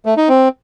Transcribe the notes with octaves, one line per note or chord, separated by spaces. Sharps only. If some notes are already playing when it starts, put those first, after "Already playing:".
A3
D#4
C4